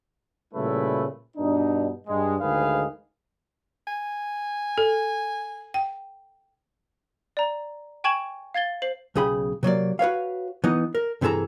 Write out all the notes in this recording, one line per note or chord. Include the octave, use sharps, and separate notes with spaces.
A#2 C#3 G3 A3 E4 B4
G2 B2 D4 D#4
G2 G#3
D2 G#2 D#3 G#4 B4 F5
G#5
A4
G5
D5 A#5
G5 G#5 C#6 G#6 E7 F#7
F5 G#6 A6 G7
C5 C7 F#7
B1 C#3 G#4 G5 B5
C3 F#3 A#3 D5
F#4 B4 C#5 F5
E3 B3 D#4
A#4
G2 C3 E3 G#4 A4 A#5